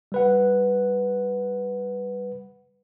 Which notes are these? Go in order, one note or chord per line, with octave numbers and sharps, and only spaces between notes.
G3 B4 F#5